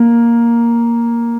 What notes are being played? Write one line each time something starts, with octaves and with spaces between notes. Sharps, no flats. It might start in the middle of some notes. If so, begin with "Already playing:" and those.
Already playing: A#3